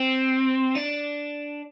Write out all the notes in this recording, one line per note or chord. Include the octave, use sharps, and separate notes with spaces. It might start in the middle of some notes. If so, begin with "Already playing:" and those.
Already playing: C4
D4